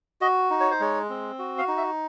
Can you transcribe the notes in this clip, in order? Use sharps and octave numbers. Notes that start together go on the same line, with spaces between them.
F#4 D#5
D#4
C#5
C5
G#3 C#5
C4
F#4
F5
D#4
E5